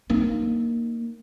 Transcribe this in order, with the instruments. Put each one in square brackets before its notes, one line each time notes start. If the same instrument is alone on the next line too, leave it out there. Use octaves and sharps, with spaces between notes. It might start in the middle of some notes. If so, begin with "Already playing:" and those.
[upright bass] A#3 D#4